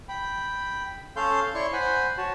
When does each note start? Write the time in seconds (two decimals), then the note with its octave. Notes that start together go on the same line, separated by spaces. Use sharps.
0.09 G5 B5
1.16 C#4 A4 F5 C6 G6
1.55 E4 C#5 D5 C6 C#6
1.73 C5 F#5 G#5 B5
2.18 F#4 C#5 A5